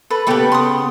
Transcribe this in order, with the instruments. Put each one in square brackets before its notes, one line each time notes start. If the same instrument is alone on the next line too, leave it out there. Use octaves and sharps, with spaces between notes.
[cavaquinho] A4 B4 B5
[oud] C#3 B3 G4 [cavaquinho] A4 B4
[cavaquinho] C6 D#6